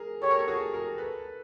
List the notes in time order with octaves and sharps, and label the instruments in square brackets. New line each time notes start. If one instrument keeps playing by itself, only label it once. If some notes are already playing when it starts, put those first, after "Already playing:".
Already playing: [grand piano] G#4 A#4
[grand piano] G4 A4 [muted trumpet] C#5
[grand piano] A#4
A4
F#4 G#4
G#4 A#4
A4 B4